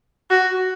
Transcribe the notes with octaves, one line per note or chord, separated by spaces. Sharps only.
F#4